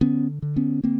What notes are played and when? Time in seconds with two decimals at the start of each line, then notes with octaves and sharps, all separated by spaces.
0.01 D3 B3 C#4
0.42 D3
0.56 B3 C#4
0.84 D3 A#3 C4